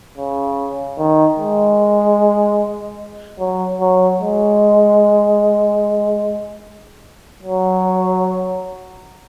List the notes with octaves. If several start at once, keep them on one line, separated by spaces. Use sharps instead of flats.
C#3
D#3
G#3
F#3
F#3
G#3
F#3